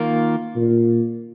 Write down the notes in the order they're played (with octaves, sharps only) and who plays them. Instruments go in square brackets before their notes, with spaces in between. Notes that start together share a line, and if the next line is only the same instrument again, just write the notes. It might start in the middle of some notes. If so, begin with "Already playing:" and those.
Already playing: [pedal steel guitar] D#3 A#3 F4 A#4
[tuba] A#2